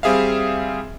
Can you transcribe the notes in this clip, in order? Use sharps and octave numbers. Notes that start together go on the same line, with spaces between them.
G3 C4 G#4 E5 F5